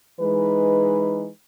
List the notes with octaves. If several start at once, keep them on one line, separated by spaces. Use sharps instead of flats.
E3 G#3 D#4 B4